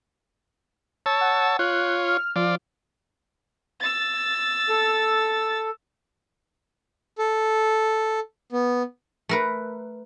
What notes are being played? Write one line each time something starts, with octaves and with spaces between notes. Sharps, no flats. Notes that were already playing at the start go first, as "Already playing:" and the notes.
C#5 A5 E6
F#5
F4 C#5 F#6
F6
F3 F4 D5
E6 A6
A4
A4
B3
A3 A#4 B4